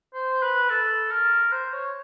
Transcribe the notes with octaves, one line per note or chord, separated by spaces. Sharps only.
C5
B4
A4
A#4
C5
C#5